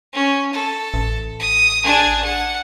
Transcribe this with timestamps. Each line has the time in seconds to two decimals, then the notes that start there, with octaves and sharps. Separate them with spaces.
0.13 C#4
0.53 A4
0.94 A1
1.40 D#6
1.84 D4 G#4
2.24 F#5